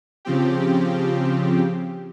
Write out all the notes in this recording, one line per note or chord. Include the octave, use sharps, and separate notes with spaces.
C#3 F3 C4 G4